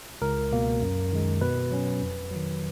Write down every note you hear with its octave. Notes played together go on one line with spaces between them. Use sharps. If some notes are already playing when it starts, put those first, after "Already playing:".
C#2 A#4
B2 A#3
F#2
D#3 G#3
B2 B4
F#3 C#4
F2
D#3 F#3